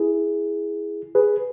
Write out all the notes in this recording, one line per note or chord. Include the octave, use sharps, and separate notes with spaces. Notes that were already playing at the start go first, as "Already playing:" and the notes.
Already playing: E4 G#4
G#4 B4